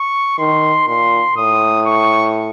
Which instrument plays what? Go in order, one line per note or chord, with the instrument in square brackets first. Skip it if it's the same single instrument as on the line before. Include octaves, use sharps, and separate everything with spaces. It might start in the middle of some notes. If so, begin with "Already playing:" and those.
Already playing: [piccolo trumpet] C#6
[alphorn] D#3 [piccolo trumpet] C6
[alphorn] A#2 [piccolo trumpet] C6
[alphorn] A2 [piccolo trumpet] D#6
[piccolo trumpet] C#6